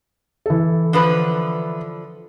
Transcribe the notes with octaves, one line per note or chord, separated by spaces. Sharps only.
E3 A4
D3 F3 B4